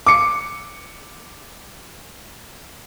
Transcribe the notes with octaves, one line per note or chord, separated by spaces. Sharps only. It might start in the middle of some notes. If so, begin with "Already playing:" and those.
D6 C#7